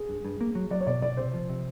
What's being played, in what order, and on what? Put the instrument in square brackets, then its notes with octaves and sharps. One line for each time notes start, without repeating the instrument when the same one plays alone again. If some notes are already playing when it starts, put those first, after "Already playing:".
Already playing: [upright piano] G#4
[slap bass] G2
G2
A#3
F#3
[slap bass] F#3 [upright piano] D5
[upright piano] C#5
[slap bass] B2 [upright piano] D5
[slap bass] B2 [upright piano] D5
[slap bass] C3 [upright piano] C5
[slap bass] F3
C3